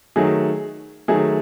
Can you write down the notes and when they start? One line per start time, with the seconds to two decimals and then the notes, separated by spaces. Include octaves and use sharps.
0.16 D#3 F#3 A3 G#4
1.08 D#3 F#3 A3 G#4